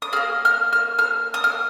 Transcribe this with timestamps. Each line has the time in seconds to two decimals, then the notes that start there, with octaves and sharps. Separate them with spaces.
0.02 D#6
0.13 A#3 G#4 F6
0.45 F6
0.73 F6
0.99 F6
1.34 D#6
1.44 F6